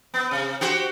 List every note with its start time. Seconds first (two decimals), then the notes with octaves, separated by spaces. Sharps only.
0.14 B3
0.31 C3
0.61 F#4 G4 C5